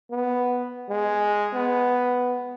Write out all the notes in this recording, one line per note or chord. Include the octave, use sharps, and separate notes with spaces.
B3
G#3
B3